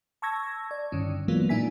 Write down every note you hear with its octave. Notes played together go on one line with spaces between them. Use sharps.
A5 C#6 E6 G#6 A#6
D5
G2 D3 D#3 C#4
E3 F#3 G#3 A#3 B3 F4
A#2 D4 D#4 E5 G#5 B6